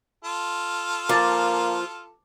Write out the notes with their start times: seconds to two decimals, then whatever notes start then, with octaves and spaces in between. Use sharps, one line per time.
0.24 F4 A4
1.09 F3 A#3 D6 A6